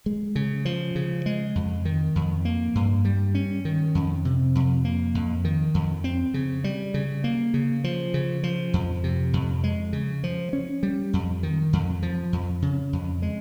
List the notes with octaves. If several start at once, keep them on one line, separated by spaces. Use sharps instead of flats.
G#3
C#3
F3
C#3
G#3
F2
D#3
F2
A#3
G2
G3
C#4
D#3
F2
C3
F2
A#3
F2
D#3
F2
C4
C#3
G3
C#3
A#3
C#3
F3
C#3
F3
F2
C3
F2
G#3
C#3
F3
C#4
G3
F2
D#3
F2
F3
F2
C#3
F2
G#3